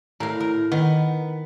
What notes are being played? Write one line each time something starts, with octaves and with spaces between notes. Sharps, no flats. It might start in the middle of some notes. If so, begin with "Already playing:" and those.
A2 A#4 F5
A#4
D#3 B3